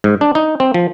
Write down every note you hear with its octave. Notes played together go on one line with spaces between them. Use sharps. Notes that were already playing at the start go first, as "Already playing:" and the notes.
G#2
D4
D#4
C4
F3